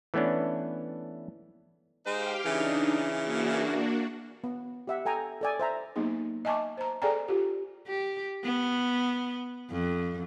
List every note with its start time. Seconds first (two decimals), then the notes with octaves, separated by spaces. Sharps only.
0.14 E3 A3 B3 C#4 D4
2.06 G#3 D#4 G4 C5 F5 G5
2.45 C#3 E3 D4 D#4
3.22 A#3 D4 F#4
4.44 B3
4.87 G4 E5 F#5
5.05 A4 G5 G#5 A#5
5.41 A4 D5 G#5
5.60 C5 E5 A#5
5.95 F#3 A#3 B3 D#4 G#4
6.45 D#5 E5 G#5 A5 C#6 D6
6.77 C5 A#5
7.02 G#4 A4 D5 G5 G#5 A#5
7.28 F4 G4
7.87 G4
8.44 B3
9.71 F2